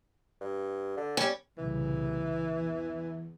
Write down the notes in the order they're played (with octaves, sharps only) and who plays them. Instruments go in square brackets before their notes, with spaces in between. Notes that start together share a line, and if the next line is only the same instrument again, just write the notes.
[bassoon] G2
D3
[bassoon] G3 [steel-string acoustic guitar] C#4
[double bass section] C2 A#2 C#3 [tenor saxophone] E3
[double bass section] E2